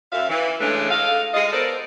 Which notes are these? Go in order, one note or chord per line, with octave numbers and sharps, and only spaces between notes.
F#2 E5 F5
E3
C#3 E3 G#3 A3 C#4 D4
A2 A4 D#5 F5
G#3 F4 G#4 D#5
B3 A4 A#4 C5 D5